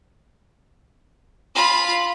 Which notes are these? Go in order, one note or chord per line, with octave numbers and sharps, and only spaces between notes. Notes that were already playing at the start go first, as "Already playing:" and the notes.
F4 B5